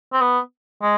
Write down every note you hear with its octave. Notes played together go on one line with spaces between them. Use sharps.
C4
B3
G#3